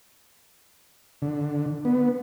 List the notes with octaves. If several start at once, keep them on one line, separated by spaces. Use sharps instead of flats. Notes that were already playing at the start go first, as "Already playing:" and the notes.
D3
B3